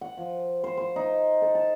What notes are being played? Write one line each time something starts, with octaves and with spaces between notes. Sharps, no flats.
F#5
F3
C5
C5
D#4
A4
A5